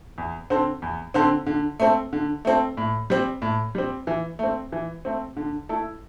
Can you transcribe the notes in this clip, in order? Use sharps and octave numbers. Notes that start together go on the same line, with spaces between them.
E2
D3 C4 A4 C5
E2
D3 C4 A4 C5
D3
A3 C4 A4
D3
A3 C4 A4
A2
G3 C4
A2
G3 C4
E3
A3 C4
E3
A3 C4
D3
A3 E4 A4